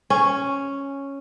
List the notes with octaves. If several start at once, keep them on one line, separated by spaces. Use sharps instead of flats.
C#4